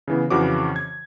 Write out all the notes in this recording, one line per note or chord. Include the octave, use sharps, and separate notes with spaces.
C#3 E3 B3
F2 C#3 E3 F#4 C#5 D6
G#6